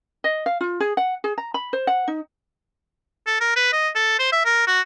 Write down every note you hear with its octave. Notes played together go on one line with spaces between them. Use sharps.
D#5
F5
F4
G#4
F#5
G#4
A#5
B5
C5
F#5
D#4
A4
A#4
B4
D#5
A4
C5
E5
A#4
F#4